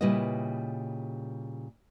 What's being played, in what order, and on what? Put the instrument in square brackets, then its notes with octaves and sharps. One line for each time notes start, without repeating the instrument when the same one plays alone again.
[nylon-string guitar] A#2 C#3 G3 E4 B4 D#5